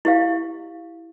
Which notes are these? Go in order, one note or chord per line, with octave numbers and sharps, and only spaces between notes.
E4 G4 F5